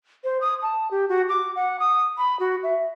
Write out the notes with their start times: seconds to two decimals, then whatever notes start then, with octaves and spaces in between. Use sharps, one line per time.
0.24 C5
0.41 D#6
0.62 A5
0.91 G4
1.09 F#4
1.29 D6
1.56 F#5
1.80 D#6
2.18 B5
2.40 F#4
2.63 E5